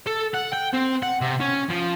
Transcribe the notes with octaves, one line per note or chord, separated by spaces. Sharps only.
A4
F#5
G5
C4
F#5
C3
C#4
F3